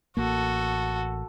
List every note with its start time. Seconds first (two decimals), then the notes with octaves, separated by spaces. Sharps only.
0.17 A1 A#3 F#4 A4